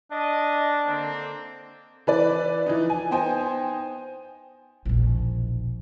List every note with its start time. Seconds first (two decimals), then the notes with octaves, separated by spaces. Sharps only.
0.11 D4 D#5
0.86 D3 A#3 C4
2.07 E3 B4 D5
2.66 E3 F3 D#4
2.90 G#5
3.11 B3 D#4 C5 G5 G#5
4.85 E1 A#1